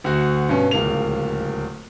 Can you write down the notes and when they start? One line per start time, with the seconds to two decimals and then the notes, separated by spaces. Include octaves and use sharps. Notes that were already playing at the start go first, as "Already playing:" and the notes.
0.04 D2 F#4 F#5
0.49 G2 B2 C#4
0.71 D1 C#2 A#3 F7